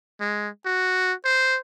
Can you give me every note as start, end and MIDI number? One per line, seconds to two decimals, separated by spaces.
0.21 0.49 56
0.66 1.13 66
1.25 1.58 72